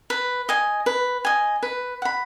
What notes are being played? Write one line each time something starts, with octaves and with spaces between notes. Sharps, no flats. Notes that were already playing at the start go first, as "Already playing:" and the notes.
B4
D#5 G#5
B4
D#5 G#5
B4
F#5 B5